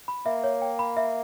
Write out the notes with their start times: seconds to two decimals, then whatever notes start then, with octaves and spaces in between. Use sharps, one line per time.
0.08 B5
0.26 A#3 E5
0.44 C#5
0.62 G5
0.79 B5
0.97 E5